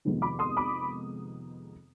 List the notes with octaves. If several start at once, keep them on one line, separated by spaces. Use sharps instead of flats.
F2 C3 D#3 G#3 B3
B5 D6
C6 D#6
B5 D6